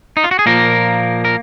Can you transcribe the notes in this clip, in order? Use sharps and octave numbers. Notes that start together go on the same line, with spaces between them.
D#4
F4
F#4
G#4
A#2 F3 A#3 A#4
A#4